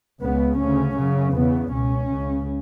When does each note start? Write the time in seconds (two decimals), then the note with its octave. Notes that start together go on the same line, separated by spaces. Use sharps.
0.21 C#2 C#3 B3
0.59 D2 C#3 C#4
0.97 F#2 C#3
1.34 E2 C#3 B3
1.72 C#2 B2 C#4
2.10 C#2 C#3